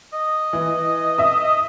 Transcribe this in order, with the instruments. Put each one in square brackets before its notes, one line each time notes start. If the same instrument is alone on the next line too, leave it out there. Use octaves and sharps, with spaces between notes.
[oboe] D#5
[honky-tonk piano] E3
E5 D#6
[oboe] D#5